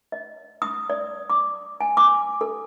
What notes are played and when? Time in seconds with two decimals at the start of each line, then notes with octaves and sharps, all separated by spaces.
0.12 D#5
0.62 D#6
0.90 D5
1.30 D6
1.81 G#5
1.97 D6
2.41 A4